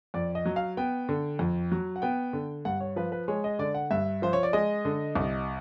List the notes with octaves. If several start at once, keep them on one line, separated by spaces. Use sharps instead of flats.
F2 D5
D#5
F#3
F5
B3 G5
D3
F2
F#3
F#5
B3 G5
D3
G2 F#5
C#5
F3 B4
B4
G#3 C#5
D#5
D3 D5
F#5
G2 E5
F3 C5
C#5
D5
G#3 D#5
D3
C2